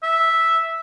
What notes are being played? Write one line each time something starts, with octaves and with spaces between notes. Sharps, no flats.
E5